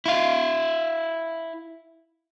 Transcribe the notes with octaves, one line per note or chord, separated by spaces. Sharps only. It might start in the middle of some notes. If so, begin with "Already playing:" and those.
E4 F5